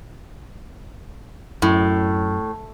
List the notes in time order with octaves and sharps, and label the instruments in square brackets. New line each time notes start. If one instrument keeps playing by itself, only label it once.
[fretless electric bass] F#2 [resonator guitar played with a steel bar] A2